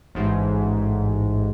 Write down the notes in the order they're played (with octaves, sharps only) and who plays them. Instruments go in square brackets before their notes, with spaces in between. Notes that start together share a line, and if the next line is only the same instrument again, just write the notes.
[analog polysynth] A1 G#2